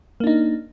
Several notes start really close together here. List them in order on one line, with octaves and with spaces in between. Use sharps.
A#3 D4 D#4